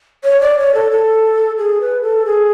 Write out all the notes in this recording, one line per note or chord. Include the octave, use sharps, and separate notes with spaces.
C#5
D5
C#5
A4
A4
G#4
B4
A4
G#4